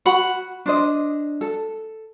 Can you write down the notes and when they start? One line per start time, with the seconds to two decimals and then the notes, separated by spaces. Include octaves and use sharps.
0.05 F#4 F#5 B5
0.66 D4 C5 D#5
1.41 A4